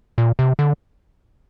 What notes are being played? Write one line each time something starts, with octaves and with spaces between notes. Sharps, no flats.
A#2
C3
D3